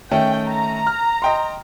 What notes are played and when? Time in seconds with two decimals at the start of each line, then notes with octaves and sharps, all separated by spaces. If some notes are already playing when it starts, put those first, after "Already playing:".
0.11 D#3 A3 C#4 G5
0.49 A#5
0.87 F6
1.22 D#5 G5 C6